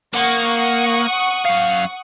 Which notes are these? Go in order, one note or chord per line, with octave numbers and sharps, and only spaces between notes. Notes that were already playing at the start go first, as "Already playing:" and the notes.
A#3 F#5 C#6 D#6
F#2 F5